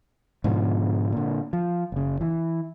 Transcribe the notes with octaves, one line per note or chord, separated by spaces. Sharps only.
G#2 B2 D3 F3
A#2 D3
F3
F#1 C#3
E3